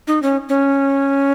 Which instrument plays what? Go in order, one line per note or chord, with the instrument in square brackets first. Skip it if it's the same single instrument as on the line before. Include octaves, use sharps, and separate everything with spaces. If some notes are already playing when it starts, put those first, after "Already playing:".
[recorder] D#4
C#4
C#4